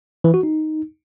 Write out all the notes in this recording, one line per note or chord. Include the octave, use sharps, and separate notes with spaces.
E3
F#4
D#4